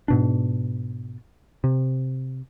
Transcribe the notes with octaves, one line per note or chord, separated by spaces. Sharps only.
G#2 B2 D4
C3